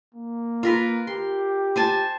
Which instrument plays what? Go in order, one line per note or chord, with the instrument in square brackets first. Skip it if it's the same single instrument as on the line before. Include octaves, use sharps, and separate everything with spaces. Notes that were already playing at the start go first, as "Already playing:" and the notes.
[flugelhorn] A#3
[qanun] F4 A#4 B4
[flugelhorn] G4 [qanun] C6
[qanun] C5 G#5 A5